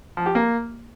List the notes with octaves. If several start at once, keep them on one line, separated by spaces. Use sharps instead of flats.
F3
G4
A#3